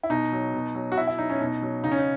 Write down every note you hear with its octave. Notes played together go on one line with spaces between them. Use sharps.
E4
B2 D#4
F#3
B2
F#3
F#4
B2 E4
E4
F#3 D#4
C#4
B2 D#4
F#3
C#3 D#4
C#4
D#4